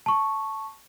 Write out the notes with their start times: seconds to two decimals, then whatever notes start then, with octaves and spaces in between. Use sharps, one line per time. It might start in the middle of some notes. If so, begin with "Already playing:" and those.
0.06 A5 C#6